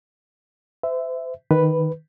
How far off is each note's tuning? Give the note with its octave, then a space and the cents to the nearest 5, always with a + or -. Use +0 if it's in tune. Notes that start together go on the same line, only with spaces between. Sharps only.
C5 -40 E5 +0
D#3 +0 B4 +0